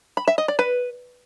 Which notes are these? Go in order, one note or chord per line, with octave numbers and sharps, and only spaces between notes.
B5
E5
D#5
D5
B4